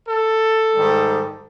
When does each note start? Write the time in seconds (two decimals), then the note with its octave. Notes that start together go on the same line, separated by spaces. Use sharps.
0.09 A4
0.75 G#2 D#3 G3